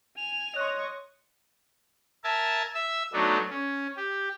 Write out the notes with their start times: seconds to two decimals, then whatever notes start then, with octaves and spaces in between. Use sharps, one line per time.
0.17 G#5 F7
0.56 C#5 D#5 C6 C#6 F#6
2.24 A#4 E5 G#5 A5
2.74 E5 E6
3.13 F#3 A3 B3 D4 D#4
3.50 C#4
3.96 G4